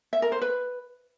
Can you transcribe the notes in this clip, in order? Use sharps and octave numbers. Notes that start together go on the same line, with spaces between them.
E5
A#4
C5
B4